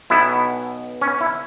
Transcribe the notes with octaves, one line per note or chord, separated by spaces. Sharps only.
B1 B2 B3 E4
C#4
E4